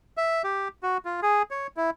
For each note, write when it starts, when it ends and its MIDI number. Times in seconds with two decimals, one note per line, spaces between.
0.17 0.42 76
0.44 0.68 67
0.83 0.98 66
1.05 1.20 65
1.22 1.43 68
1.51 1.67 73
1.77 1.90 64